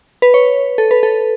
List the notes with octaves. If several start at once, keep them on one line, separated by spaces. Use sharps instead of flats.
B4
C#5
A4
B4
A4